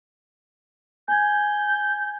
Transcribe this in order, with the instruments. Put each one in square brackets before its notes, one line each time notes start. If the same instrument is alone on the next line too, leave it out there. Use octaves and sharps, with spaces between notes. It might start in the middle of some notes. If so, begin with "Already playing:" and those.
[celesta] G#5 G#6 [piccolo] G6